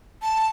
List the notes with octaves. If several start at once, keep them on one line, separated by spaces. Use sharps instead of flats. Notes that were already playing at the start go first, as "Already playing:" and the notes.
A5